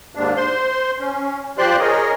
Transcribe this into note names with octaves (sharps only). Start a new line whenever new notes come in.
D#2 G#2 D4
C5 C6
C#4
F3 G4 C5 D5 C6 F#6
G#4 A#4 C#5 D#5